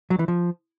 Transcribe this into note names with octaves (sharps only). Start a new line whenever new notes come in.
F#3
E3
F3